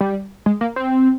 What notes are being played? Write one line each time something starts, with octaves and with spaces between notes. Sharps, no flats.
G3
G#3
A#3
C4